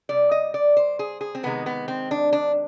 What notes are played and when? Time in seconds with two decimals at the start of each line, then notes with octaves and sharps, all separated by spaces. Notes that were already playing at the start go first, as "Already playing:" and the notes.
0.09 C3 G3 D5
0.31 D#5
0.54 D5
0.77 C5
0.99 G#4
1.21 G#4
1.35 C4
1.43 C3 D#3 G#3 B3
1.66 B3
1.88 C4
2.11 D4
2.33 D4